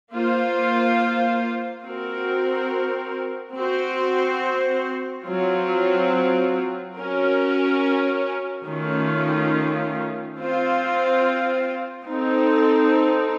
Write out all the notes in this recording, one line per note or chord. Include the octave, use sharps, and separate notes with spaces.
A#3 F4 C5
C4 F#4 A#4
C4 F#4 C5
F#3 C4 F4
C#4 F#4 A#4
D#3 A3 C#4 F4
C4 F4 C5
C4 D#4 A4